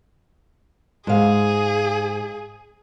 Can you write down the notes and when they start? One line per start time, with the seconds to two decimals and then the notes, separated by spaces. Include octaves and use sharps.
1.07 G#2 G#4 F5